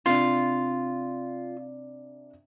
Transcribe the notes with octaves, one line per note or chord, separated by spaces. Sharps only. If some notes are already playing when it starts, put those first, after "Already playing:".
C3 D4 F4